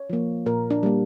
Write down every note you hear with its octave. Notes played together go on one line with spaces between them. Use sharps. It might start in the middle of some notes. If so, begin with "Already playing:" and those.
Already playing: C#5
F3 A#3
A#2 A#4
D4
G3 A#3